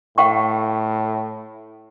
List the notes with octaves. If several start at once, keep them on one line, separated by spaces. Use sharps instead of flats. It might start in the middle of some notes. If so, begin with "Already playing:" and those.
A2 F5 G5 C#6